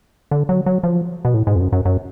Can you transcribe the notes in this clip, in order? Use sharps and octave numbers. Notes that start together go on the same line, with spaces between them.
D3
F#3
F#3
F3
B2
A2
G#2
F2
F#2
F#2
F#2